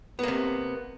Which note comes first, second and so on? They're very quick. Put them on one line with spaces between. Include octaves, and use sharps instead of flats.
B3 A#3 C3